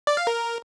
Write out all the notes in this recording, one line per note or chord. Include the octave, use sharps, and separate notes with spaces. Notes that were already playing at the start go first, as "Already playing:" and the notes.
D5
F5
A#4